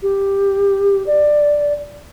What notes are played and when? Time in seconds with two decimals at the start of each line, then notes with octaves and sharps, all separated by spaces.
0.02 G4
1.06 D5